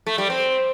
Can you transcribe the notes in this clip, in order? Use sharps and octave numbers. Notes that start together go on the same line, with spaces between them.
A3
G3
C4